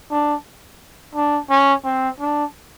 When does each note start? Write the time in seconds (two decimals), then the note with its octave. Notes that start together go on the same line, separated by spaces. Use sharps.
0.11 D4
1.15 D4
1.49 C#4
1.85 C4
2.20 D4